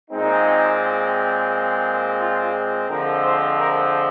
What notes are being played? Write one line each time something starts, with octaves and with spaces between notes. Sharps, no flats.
A#2 G#3 C4 D#4
F4
D3 F3 G#3 C4 A#4
C5
A#4